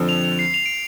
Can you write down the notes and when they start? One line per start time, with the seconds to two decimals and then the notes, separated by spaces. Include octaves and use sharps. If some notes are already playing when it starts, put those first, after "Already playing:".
Already playing: F2 D3 F3 C4 A4
0.09 F7
0.24 F7
0.39 C7
0.54 F7
0.66 D7